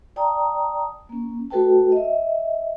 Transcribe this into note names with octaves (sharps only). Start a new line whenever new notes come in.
D5 G5 A5 A#5 D#6
A#3 C#4
A3 F#4 A4 B4 G5 A5
D#5 E5